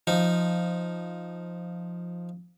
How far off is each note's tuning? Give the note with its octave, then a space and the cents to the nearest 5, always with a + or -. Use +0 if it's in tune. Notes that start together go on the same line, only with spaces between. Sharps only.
F3 +0 D#4 +0